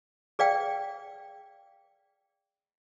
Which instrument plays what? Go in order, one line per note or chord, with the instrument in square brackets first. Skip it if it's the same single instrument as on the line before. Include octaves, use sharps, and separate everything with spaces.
[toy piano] G#4 D5 F5 G5